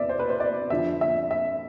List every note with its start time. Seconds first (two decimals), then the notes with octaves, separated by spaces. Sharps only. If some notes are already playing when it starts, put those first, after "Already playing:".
Already playing: E2 B2 D5 E5
0.09 C5
0.19 B4
0.30 C5
0.40 D5
0.70 F2 D3 F3 E5
1.01 E5
1.31 E5